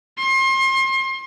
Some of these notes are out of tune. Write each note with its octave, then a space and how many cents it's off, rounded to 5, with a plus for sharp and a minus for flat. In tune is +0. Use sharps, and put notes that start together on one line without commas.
C6 +35